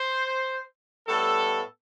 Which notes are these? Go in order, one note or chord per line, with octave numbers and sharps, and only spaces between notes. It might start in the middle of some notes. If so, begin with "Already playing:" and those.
Already playing: C5
A2 G3 B3 A4